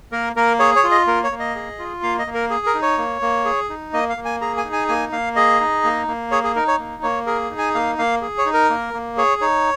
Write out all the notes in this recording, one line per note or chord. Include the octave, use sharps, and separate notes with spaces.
A#3 A#4
A#3 A#4
G#4 C#5
C#5
F4
D#5
A#3 A#4
C#5
A#3
D#5
G#4
F4
A#3 F5
D#5
A#3
A#4
G#4
A#4
D#4
C#5
A#3
A#3
G#4
D#4
A#3 D#5
F5
A#3
G#5
G#4 A#5
G#5
D#4
G#5
A#3 G#5
A#3 F5
G#4 D#5
D#4
A#3
A#3
G#4 C#5
G#4
D#4 A#4
C#5
A#3
A#3 C#5
G#4 A#4
D#4
G#5
A#3 F5
A#3 F5
G#4
C#5
D#4
A#4
A#3
A#3
G#4 C#5
D#4 C#5